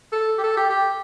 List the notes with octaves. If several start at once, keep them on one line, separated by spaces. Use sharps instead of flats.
A4
G4
A4
G4
G4